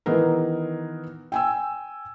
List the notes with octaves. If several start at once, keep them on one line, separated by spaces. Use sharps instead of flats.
D#3 E3 B3 G#4 A#4
G5 G#5 E6